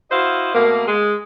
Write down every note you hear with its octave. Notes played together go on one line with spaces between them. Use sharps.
E4 F#4 C5 D#5 F5
B2 A3 A#3
G#3